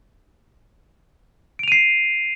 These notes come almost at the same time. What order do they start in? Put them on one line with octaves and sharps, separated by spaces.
D7 F7 D#7 C7